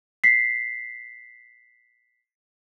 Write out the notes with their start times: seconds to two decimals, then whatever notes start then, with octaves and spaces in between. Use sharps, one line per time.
0.24 B6 C7